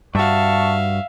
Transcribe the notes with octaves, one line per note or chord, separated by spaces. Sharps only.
G2 F#4 E5 F5 A5 C#6